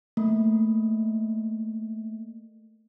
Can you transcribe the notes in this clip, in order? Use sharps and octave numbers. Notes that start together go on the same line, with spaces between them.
A3 A#3